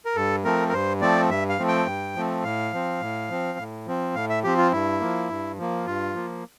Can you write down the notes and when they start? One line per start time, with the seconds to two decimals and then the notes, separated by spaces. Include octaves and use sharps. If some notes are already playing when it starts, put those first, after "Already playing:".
0.05 A#4
0.16 G2 A4
0.44 F3 A3 C4 A#4
0.69 A#4
0.73 G2 C5
1.01 F3 A3 C4 D5
1.29 G2 E5
1.49 F5
1.59 F3 A3 C4
1.68 G5
1.86 G2
2.16 F3 A3 C4
2.44 A2 F5
2.73 F3 C4
3.01 A2
3.29 F3 C4
3.58 A2
3.86 F3 C4
4.15 A2 F5
4.29 E5
4.44 F3 C4 G4
4.58 F4
4.72 G2 E4
5.01 F3 A#3
5.30 G2
5.58 F3 A#3
5.86 G2 F4
6.15 F3 A#3